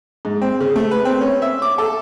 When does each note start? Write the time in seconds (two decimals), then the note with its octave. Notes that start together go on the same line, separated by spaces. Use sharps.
0.25 G#2
0.41 C4
0.60 C#3
0.76 A3
0.91 B4
1.05 C4
1.21 C#4
1.42 E5
1.62 D6
1.78 A4